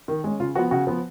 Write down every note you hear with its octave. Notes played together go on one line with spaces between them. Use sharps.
D#3
G#3 C#4
C#3 F4
F3 B3 F#4
C#3 F#4
F3 B3